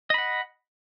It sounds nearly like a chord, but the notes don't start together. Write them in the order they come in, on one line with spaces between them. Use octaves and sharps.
D#5 B5 F#5